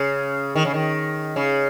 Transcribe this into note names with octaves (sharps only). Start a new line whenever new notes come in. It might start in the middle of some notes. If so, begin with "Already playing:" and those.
Already playing: C#3
D#3
C#3
D#3
C#3